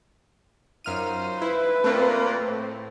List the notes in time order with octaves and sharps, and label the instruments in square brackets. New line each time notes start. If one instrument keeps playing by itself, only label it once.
[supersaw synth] F#2 F6 D#7 [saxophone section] D#4 F4 C5
[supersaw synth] E4 [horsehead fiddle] B4
[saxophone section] A#2 A#3 [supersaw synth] A3 C4
[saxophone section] A2